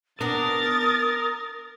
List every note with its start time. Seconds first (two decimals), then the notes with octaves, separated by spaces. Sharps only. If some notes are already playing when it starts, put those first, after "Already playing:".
0.21 B3 D4 A#4 D#6 A6